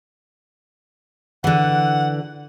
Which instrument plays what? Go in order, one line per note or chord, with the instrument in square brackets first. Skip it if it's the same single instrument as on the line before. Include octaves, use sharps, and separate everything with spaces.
[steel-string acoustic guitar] D3 E3 [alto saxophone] F#5